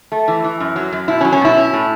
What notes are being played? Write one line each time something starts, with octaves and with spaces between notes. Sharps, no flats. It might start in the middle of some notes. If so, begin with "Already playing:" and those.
A3
E3
E3
F#2
F#3
F#2
B2 E4
C#4
F#3
C#4
B2 E4
C#4
A2